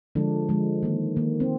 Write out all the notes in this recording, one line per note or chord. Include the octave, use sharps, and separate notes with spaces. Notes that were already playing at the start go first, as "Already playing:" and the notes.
D3 F3 G#3 D4
D3 F3 G#3
D#3 A#3
D#3 A#3
C4